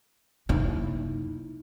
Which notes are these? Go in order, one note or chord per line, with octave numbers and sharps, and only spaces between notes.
F#2 C3 A#3 D#4 E4